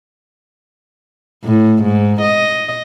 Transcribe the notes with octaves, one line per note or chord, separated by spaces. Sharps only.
A2
G#2
D#5